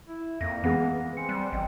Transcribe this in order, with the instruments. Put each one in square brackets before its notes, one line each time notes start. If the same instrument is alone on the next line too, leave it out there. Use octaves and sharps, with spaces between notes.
[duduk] E4
[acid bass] F2 [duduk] A#3 [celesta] A#6
[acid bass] E3 [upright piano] G#3 B3 [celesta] F#5
[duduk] C4 [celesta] G#5 C#7
[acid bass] G3 [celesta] F#6
[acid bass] A1 [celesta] D#5 G5